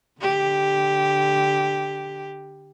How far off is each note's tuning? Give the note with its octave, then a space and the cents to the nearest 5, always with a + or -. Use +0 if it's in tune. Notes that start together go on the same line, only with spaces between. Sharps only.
D3 +0 G4 +0